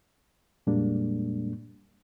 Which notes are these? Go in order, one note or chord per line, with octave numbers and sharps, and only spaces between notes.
F2 A#2 G3 G#3 A#3 D4